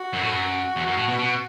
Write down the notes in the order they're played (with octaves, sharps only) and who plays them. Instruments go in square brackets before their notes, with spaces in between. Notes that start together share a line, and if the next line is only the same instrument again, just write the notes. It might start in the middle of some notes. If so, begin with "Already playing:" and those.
Already playing: [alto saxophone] F#4
[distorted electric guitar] F#2
A2
F#2
E2
F#2
A2
B2
B2